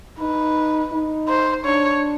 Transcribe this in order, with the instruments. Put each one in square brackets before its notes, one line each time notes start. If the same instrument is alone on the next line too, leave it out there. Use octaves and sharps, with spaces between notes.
[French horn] D#4 [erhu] B4
[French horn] D#4
[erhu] C5
[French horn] D4 [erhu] C#5